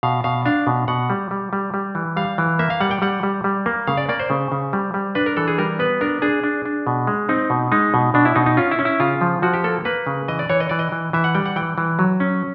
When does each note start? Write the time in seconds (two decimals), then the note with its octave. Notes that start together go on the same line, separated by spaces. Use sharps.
0.03 B2 F5
0.24 B2 F5
0.46 D4 F5
0.67 B2
0.88 B2 F#5
1.10 G3
1.31 G3
1.53 G3
1.74 G3
1.95 E3
2.17 G3 F5
2.38 E3
2.59 A#3 E5
2.70 F5
2.81 G3 F#5
2.91 G5
3.02 G3 F#5
3.23 G3
3.44 G3
3.66 A#3
3.87 C#3 F5
3.97 D5
4.09 A#3 D5
4.20 C5
4.30 C#3
4.52 C#3
4.73 G3
4.94 G3
5.15 D4 B4
5.26 A#4
5.37 E3 A4
5.48 G#4
5.58 G3 A#4
5.79 B3 B4
6.01 D4 A#4
6.22 D4 G#4
6.44 D4
6.65 D4
6.87 B2
7.07 G#3
7.29 C4 D#4
7.50 B2
7.72 G#3 D#4
7.94 B2
8.14 B2 D4
8.25 E4
8.35 B2 D#4
8.46 D#4
8.57 C#4 F4
8.71 E4
8.79 C#4
8.85 E4
9.00 C#3 F4
9.21 F3
9.42 F3 F#4
9.53 G4
9.64 A#3 A4
9.85 A#3 B4
10.07 C#3
10.28 E3 D#5
10.39 D5
10.49 E3 C#5
10.60 D#5
10.69 E3 D5
10.79 D#5
10.92 E3
11.13 E3 E5
11.24 F#5
11.35 G3 G5
11.46 F#5
11.56 E3 G5
11.78 E3
11.99 F#3
12.20 C#4